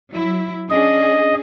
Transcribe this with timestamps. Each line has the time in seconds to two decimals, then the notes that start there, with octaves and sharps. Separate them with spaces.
0.10 F#3 E4
0.70 C#4 D4 G#4 D#5